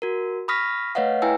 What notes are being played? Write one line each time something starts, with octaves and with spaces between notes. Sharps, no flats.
F#4 A#4
B5 C#6 D#6 F6 A#6 B6
A3 B4 C#5 D#5 F5 F#5
E4 B4 G5 G#5 E6